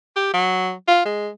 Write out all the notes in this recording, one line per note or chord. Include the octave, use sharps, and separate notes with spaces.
G4
F#3
F4
G#3